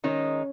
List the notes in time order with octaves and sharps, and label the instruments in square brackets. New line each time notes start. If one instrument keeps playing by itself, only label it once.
[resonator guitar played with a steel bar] D#3 G#3 D#4 [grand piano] C#4